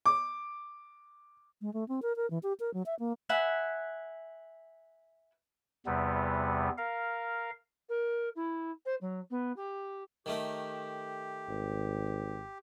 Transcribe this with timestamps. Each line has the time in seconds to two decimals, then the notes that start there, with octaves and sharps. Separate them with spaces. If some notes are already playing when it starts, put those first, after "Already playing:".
0.06 D6
1.61 G#3
1.74 A3
1.88 C4
2.02 A#4
2.16 A#4
2.30 E3
2.43 G4
2.60 A#4
2.74 F#3
2.86 E5
2.99 A#3
3.29 B4 E5 F#5 G#5
5.86 E2 C3 G3 B3
6.78 A#4 F5
7.89 A#4
8.35 E4
8.85 C5
9.01 F#3
9.30 B3
9.56 G4
10.26 D#3 A3 G4 A#4
11.48 G#1